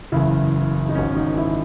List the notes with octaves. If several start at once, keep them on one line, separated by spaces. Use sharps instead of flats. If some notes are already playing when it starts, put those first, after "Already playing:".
F#1 E2 C#3 E4
D#4
G#1 G#2 D#3 C#4
C#4
D#4
E4